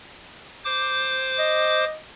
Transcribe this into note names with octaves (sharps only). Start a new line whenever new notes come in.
C5 D6
D#5